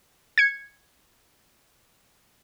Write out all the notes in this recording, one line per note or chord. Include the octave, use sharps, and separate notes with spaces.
G#6 C#7